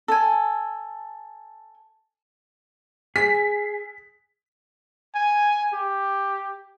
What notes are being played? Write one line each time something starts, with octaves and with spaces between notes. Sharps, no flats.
A4 G#5
G#4 B6
G#5
G4